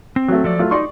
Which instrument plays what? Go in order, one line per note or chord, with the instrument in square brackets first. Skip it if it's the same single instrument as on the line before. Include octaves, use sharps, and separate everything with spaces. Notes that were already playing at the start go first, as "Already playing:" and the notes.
[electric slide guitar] C4
[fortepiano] F#3 A3
[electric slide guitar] F3 A4 D5
[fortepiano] F#3 A3 F4
[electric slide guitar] D#4 [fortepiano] D5 C6 C#6